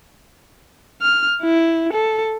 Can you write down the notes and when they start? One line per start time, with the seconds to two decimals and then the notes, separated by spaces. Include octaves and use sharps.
1.02 F6
1.42 E4
1.93 A4